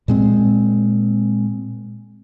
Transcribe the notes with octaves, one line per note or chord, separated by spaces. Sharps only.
A#2 G#3 C4